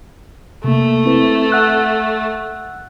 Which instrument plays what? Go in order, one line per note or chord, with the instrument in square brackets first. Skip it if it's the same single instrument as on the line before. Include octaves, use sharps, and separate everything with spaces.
[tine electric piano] C3 A#3 [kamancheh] A3
[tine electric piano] C4 E4 B4
F#5 E6 F#6